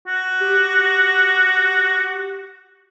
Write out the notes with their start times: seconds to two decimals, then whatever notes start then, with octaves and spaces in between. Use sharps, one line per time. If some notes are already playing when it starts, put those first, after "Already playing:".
0.08 F#4
0.41 G4